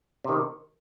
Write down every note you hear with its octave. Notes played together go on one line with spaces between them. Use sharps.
C3 D#3